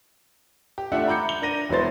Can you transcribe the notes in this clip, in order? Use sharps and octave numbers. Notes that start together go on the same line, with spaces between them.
G4
A3 D4 F4 A4 E5 F#5
A#5 B5 D6 G6 C#7
G7
D4 A#4 A#6 D#7
E1 F#3 E4 C5 A6